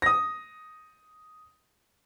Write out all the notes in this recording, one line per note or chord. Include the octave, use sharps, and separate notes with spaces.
D#6 A#6